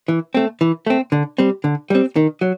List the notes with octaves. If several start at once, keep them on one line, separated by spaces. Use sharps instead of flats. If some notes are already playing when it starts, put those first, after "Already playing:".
E3
A3 C4
E3
A3 C4
D3
G3 C4
D3
G3 C4
D#3
F#3